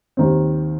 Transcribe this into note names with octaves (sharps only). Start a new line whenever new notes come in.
D#2 D#3 C4